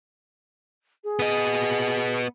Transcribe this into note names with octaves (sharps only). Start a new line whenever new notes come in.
G#4
B3 D#5